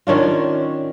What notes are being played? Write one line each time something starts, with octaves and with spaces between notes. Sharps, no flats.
D#3 C#4 D4 F4